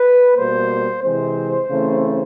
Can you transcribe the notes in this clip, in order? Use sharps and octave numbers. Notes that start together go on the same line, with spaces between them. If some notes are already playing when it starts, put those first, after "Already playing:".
Already playing: B4
B2 G3 A#3 C5
C3 E3 G#3 C4 C5
C#3 E3 A3 C4